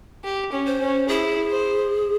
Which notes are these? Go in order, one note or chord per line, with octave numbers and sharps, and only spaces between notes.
G4
C#4
C5
C#4
E4 G#4
C5